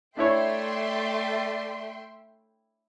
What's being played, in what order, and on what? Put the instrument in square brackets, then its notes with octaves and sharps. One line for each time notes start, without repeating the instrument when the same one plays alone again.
[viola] A3 [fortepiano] D4 E4 C#5 [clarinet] D5 [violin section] E5 G5 C6